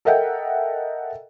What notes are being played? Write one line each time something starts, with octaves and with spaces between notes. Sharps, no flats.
A4 A#4 D#5 E5 F#5 G5